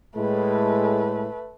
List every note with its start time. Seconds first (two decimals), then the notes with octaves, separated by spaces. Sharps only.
0.16 A2 G#3 A3 B4